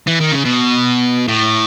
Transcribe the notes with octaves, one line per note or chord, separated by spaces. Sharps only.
E3
D#3
C#3
B2
A2